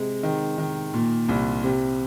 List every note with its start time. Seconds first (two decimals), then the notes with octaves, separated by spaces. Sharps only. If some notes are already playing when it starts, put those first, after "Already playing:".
Already playing: C3 G#3
0.23 D#3
0.58 D#3
0.94 A#2
1.29 C2
1.64 C3